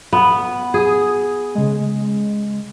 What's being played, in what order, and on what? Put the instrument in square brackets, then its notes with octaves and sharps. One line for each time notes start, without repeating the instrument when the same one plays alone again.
[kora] B3
[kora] G#4 [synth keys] D#6
[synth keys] C#3 G#3